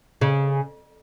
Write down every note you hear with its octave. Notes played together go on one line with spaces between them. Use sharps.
C#3